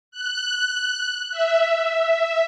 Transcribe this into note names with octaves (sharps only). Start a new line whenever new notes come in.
F#6
E5